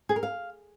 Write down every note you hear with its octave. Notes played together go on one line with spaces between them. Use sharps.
G#4
A#4
F5